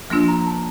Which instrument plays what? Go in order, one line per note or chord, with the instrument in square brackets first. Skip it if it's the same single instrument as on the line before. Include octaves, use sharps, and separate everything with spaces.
[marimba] F3 A#3 D4 F4
[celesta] A#5
A5